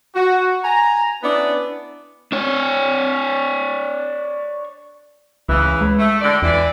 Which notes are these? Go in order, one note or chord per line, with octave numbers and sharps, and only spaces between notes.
F#4
G#5 A#5
B3 C#4 D4 E4 B4
D4 C#5
C#2 C#3 E3
G#3
A3
A2 D3 D5
E2 E3 D5